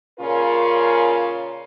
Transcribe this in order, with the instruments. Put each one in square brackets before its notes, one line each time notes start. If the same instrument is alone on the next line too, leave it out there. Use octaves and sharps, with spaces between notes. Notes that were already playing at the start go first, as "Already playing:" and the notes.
[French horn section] A#2 C#3 C#4 F4 A#4